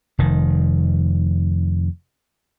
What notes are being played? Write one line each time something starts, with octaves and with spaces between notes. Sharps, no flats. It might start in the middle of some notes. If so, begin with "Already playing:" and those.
F1 D#3